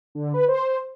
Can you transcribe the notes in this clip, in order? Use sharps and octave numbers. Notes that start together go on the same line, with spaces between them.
D3
B4
C5